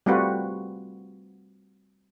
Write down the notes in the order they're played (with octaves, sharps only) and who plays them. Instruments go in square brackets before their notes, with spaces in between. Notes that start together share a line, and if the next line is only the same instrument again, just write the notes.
[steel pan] G3 A3 C4 F4 F#4 B4